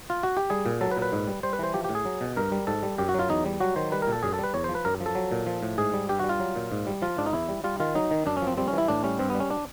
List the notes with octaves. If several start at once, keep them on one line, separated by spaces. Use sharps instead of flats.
F4
F#4
G4
G3 G#4
A#2
F#3 A4
B4
A#2
B4
G#2
G3
G3 C5
B4
E3 C5
F3 G4
G4
A2
G#4
F#3
B2
G2 A#4
G3
G#2 A4
G3
F#2 G4
F#4
F#3 F4
E2 D#4
G3
F#3 F#4
D#3 C5
G3 B4
A#4
A#2
A4
F#2 G#4
A4
G3 B4
E2 C#5
C5
F3
B4
F#2 A#4
F3
A4
F#3
A#2
F3
A2
G#2 G#4
G3
G2 G4
F#4
G3
F4
F#3
A#2
G#2
G3
F3 F4
G#2 D4
D#4
E2 E4
G3
G3 F4
D#3 F4
F#3 D#4
D#3
F#2 D4
C#4
F3
C4
G3 C4
C#4
E3
E4
A2 D4
G3 C#4
G2 C4
B3
G3
C#4
D4